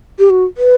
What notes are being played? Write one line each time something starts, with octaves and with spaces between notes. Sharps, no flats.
G4
F#4
B4